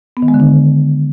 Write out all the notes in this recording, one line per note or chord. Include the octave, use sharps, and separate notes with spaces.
B3
D#3
G#3
D3
D4